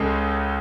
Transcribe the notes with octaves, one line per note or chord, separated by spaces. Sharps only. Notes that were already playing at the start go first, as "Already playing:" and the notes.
Already playing: C#2 C#3 G#3 A4 G#5